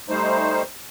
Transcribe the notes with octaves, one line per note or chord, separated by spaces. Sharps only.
G3 A3 D#4 C5